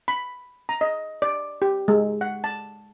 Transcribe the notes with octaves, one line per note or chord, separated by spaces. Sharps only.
B5
A#5
D#5
D5
G4
G#3
F#5
A5